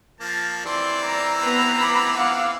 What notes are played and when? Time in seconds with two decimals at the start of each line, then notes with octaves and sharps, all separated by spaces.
0.20 F3 A#3 A5
0.66 E3 C4 D5 C6 E6
1.06 A#5
1.44 B3 B4 A#5
1.78 B5 D6
2.18 F5 F#5 D6